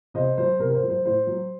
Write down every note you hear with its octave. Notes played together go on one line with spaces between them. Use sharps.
C3 C5 D#5
F#3 C5
C3 A#4
A#4
C5
F#3
C5
A2 C5
F#3